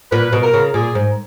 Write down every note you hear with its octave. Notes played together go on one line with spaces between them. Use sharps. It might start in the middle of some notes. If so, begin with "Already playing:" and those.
A#2 B4
B2
A#4
C#3
A#2 G#4
G#2